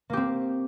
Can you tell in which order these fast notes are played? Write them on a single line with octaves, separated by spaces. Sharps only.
A#3 G4 C4